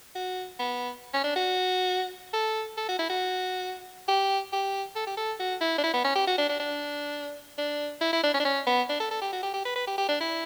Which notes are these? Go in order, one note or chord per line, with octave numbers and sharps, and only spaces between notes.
F#4
B3
C#4
D4
F#4
A4
A4
F#4
E4
F#4
G4
G4
A4
G4
A4
F#4
E4
D4
E4
B3
C#4
G4
F#4
D4
D4
D4
D4
E4
E4
D4
C#4
D4
C#4
B3
D4
A4
A4
G4
F#4
G4
G4
B4
B4
G4
G4
D4
E4